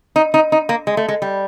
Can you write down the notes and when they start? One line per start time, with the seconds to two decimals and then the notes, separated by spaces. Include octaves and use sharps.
0.16 D#4
0.34 D#4
0.52 D#4
0.69 A#3
0.87 G#3
0.97 A3
1.08 G#3
1.22 G3